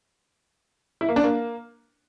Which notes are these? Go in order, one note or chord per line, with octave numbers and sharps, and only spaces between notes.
E4
A#3
D4
A#3